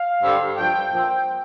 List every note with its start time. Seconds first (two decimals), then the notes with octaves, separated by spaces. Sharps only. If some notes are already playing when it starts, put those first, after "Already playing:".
Already playing: F5
0.22 G2 D3 G3 C4
0.57 G2 F3 A3 G5
0.91 A#2 F3 C4 G5